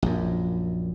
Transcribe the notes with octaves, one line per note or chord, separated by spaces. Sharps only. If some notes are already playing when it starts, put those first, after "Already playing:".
A#1 F#2